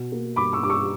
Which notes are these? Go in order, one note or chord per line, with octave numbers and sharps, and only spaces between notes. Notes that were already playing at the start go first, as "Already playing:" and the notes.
Already playing: B2
A#3
G2 B5 D6
C#6 E6
G2 D6
C#6 E6